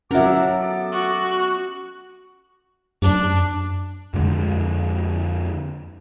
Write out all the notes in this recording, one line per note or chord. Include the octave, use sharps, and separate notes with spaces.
F#3 C#4 A#4 E5 F#5 A5 D6
B3 A4 D6
F#4
F#2 D4
F2 D3 G#3